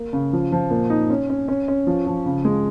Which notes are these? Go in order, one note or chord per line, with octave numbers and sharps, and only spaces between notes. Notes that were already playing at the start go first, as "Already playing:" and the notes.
Already playing: A#3
C#3
F3
F3
A#2
D#4
C#4
C#4
C#4
C#4
F3
F3
C#3
G#3